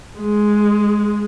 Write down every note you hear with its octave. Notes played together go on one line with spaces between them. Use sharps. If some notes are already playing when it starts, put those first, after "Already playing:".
G#3